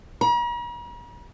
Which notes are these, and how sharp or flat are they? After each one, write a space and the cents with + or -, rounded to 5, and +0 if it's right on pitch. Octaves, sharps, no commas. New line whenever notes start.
A#5 +45